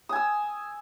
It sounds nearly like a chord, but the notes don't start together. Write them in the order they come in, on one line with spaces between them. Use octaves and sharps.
D#6 G#5 E6